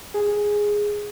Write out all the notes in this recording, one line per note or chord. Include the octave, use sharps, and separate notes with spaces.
G#4